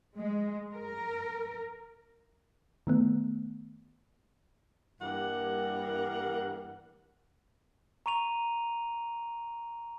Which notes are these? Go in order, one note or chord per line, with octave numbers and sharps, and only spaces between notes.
G#3
A#4
D#3 A3 B3
G2 E3 G3 A#3 A#4 F#5
A#5 C#6 D#7 F7